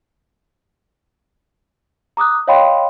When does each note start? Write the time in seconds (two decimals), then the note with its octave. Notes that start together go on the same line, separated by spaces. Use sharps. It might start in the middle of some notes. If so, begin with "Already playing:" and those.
2.17 A#5 D6 D#6 F#6
2.47 C#5 D#5 F5 G5 B5 C6